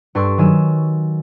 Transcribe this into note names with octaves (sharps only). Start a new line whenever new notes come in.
G2 A4 B4 C6 C#6 D7
D#3 F#3 G#5 E6 E7